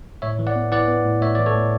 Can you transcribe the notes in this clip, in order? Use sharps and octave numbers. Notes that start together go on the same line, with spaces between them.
A2 C#5 E5
E3
D5 F#5
B3
E3 D5 F#5
B3
A2
A2 C#5 E5
E3 D5
A4 C#5
A2